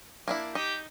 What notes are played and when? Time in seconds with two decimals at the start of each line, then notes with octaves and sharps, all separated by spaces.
0.28 A#3 D4 E4
0.55 D#4 G4